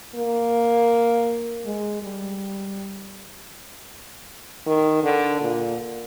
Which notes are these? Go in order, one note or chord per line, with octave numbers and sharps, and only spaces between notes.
A#3
G#3
G3
D#3
D3
A#2